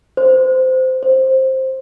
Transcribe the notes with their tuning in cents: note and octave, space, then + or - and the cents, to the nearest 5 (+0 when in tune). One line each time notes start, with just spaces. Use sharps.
C5 -15
C5 +10